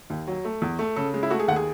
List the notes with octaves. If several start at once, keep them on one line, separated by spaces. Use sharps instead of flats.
D#2
F#3
A3
E2
A3
C#3 A4
G#3
E4
A3 F#4
G#4
D#2 F#5
G#4